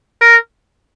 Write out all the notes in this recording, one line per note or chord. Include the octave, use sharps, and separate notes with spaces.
A#4